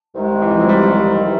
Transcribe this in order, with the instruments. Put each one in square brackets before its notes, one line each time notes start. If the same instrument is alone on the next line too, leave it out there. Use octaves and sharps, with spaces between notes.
[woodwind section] C2 C3 D#3 G#3
[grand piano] E3
F3
F#3
G3
[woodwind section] C3 E3